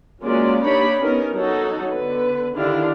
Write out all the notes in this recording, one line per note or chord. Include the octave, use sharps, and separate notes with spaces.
F#3 G#3 A#3 C#4 F4 D5
A#3 D4 D#4 G4 C#5 B5
B3 C#4 D#4 A#4
F#3 D#4 F#4 A4
D3 B3 B4
D3 D#3 D4 E4 G4 F5